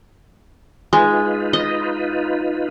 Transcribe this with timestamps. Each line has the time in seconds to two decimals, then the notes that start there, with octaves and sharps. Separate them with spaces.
0.93 G#3 D#4 F4 B4
1.53 D#5